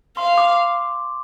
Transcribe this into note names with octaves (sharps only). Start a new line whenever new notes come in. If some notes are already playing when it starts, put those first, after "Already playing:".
F5 C6
D6